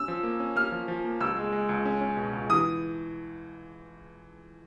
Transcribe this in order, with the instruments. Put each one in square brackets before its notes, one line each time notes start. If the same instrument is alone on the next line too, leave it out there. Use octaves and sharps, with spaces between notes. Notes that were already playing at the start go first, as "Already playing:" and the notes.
Already playing: [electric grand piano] C#4 [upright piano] E6
[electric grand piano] F3
A#3
C#4
[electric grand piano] A#3 [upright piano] F6
[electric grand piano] F3
F3
A#3
[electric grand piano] C#2 [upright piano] E6
[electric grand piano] G#3
G#3
C#2
C#4
C#4
B2
C#2
[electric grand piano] E3 [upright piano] D#6